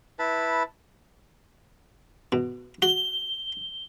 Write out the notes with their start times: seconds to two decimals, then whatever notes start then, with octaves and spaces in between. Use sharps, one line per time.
0.19 E4 B4 A5
2.32 B2
2.82 F#4 G7